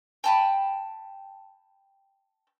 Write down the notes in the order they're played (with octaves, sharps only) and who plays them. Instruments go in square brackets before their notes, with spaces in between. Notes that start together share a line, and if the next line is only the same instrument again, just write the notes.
[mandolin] G5 A5 B5